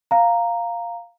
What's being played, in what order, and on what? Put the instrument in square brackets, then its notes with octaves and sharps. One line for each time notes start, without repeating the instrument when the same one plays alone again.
[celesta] F5 A#5